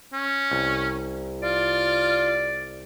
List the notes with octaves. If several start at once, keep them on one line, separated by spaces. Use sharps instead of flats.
C#4
C2
F4 D5